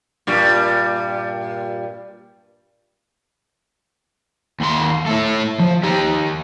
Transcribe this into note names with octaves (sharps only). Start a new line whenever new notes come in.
G2 A#2 G3
D#2 C6
A3 E4
F3
D#3 G4